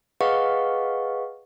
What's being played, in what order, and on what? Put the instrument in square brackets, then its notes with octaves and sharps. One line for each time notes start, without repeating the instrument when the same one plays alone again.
[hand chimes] G#4 B4 D#5 F5 F#5 C#6